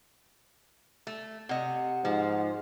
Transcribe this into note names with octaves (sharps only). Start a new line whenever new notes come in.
A3
C3 D#5 F#5
G#2 F3